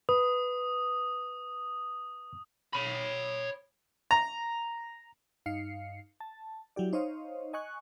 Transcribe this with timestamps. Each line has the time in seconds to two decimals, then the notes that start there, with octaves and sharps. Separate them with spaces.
0.09 B4 D#6
2.73 C#5 B5
4.11 A#5
5.46 G2 D#4 F5 C7 C#7
6.20 A5
6.76 F#3 E4 G4 D5
6.93 D#4 C5 C#5 D#5 F5
7.53 D#5 G#5 C#6 F#6